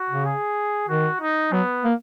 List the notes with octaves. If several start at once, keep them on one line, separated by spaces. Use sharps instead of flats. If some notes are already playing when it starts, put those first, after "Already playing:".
Already playing: F#4
C#3
G#4
D#3 F#4
D#4
F#3 B3
A#3